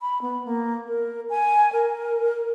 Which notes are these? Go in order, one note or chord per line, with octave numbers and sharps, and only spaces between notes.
B5
B3
A#3
A#4
G#5
A#4